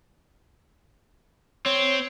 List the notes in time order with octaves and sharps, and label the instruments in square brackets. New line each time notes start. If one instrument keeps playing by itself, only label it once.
[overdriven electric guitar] C4 [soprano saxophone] C#5